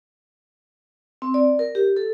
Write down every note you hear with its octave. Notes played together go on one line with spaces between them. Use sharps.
C4
D5
A#4
G4
A4